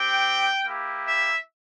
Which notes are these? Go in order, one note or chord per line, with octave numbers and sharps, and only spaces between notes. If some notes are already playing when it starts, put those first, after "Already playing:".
Already playing: C4 G4 G5
A#3 E4 G4
E5